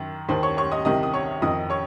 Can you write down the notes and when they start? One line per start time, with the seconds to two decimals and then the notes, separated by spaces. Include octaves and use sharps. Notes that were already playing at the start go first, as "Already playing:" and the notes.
Already playing: F#2 D#3
0.29 D#2 D#3 C5 C6
0.43 C#5 C#6
0.57 C#5 C#6
0.72 D#5 D#6
0.85 C2 C3 D#3 D#5 D#6
1.03 D#6
1.14 C#5 C#6
1.42 F2 D#3 D#5 D#6
1.70 C#5 C#6